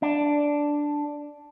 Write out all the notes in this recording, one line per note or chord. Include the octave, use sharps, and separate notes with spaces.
D4